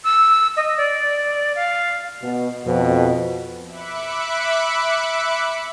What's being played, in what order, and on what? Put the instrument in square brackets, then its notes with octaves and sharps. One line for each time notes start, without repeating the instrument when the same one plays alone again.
[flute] E6
D#5
D5
F5
[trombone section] B2
F2 B2
[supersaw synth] E5 B5 D6 F#6 C#7